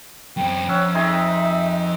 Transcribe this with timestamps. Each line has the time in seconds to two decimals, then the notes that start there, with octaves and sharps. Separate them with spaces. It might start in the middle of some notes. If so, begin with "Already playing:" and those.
0.37 F#2 C4 G5
0.69 F2 C#4 E5 F#5
0.94 C4 D#4 G#4 E5